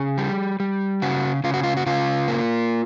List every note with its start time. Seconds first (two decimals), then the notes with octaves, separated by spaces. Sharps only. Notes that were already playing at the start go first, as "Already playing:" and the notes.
Already playing: C#3 G#4
0.18 G3
0.60 G3
1.02 C#3 F#4
1.44 C#3 F4
1.54 F#4
1.63 F4
1.77 F#4
1.86 C#3 F4
2.28 A#3